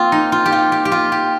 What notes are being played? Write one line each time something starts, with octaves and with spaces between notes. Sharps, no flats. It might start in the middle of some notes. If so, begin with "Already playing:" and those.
Already playing: A#3 C4 F4
D#4
F4
G4
F4
G4
G4
F4
G4